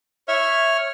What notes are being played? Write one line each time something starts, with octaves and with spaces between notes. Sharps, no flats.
C#5 E5 F6